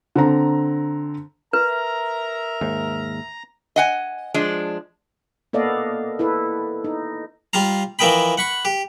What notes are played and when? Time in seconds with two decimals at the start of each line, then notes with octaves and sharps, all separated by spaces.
0.15 D3 C4 A#5
1.53 A#4 B4 E5 A#5
2.61 D#2 G#2
3.76 D#5 F#5 G#5
4.34 F3 G#3 D4
5.53 A#3 B3 A4 D5 D#5 F5
6.19 E4 A4 B4
6.84 D#4
7.53 G3 F4 F5 A#5
7.99 E3 F3 A#4 D#5 G5 B5
8.38 F#5 B5 C#6
8.65 G4